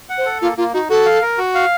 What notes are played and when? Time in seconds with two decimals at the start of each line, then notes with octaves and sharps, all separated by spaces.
0.09 F#5
0.18 C5
0.26 A4
0.42 A#3 F4
0.57 A#3 F4
0.73 D#4 F#4
0.90 F#4 A4
1.05 F5
1.22 A#4
1.38 F#4
1.55 F5